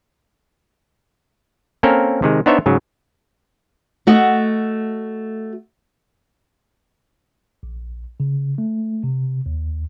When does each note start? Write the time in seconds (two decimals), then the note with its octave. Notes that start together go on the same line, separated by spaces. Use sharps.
1.83 A#3 C4 C#4 A4 A#4
2.22 C3 D#3 G#3
2.46 B3 D4 D#4 C5 C#5 E5
2.66 G#2 C#3 F#3
4.07 A3 F#4 D#5
7.63 A#1
8.20 C#3
8.58 A3
9.03 C3
9.46 D#2